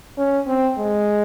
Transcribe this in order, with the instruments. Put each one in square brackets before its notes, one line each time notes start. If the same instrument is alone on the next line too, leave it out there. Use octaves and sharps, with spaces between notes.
[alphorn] C#4
C4
G#3